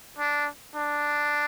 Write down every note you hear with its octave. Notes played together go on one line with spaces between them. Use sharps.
D4
D4